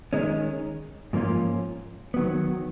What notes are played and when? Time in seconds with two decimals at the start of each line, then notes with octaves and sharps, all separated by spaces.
0.13 D#3 G#3 C#4
1.13 G#2 F3 A#3 C#4 F4
2.14 D#3 F#3 B3